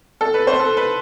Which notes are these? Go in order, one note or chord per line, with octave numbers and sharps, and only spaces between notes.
A4
B4
C5
A4
B4